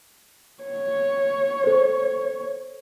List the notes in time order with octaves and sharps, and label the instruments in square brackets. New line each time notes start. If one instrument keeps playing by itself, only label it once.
[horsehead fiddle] C#5
[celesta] A4 C5